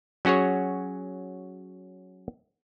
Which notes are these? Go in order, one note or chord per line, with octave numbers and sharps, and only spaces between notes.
F#3 C#4 F#4 G#4 C#5